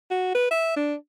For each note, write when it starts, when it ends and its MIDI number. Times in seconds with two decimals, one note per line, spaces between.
0.10 0.32 66
0.35 0.47 71
0.51 0.74 76
0.77 0.95 62